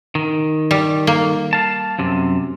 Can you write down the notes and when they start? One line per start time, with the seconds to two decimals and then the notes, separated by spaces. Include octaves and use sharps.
0.15 D#3
0.71 G3
1.07 A#3
1.53 F5 A5
1.99 F#2 C3